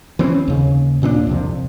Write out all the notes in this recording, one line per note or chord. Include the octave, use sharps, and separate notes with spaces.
E3 C4 C#4
D#2 C#3
D#2 A#2 B3 D4
C2 F2 C3